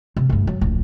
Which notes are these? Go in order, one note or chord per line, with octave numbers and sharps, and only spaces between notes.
C3
D2 G2
F#3
D1 A#1